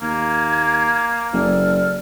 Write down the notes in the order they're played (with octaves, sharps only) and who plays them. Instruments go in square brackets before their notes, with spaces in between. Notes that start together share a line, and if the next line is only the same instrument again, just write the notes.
[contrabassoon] D#2 [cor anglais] A#3 [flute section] G#6
[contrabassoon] F#1 [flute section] A4 D5 F6